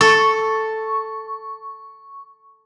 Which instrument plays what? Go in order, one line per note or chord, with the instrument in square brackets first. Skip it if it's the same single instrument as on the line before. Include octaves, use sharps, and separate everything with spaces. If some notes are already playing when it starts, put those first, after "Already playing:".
[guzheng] A4 [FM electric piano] C#6